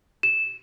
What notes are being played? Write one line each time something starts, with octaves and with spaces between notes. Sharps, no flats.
E7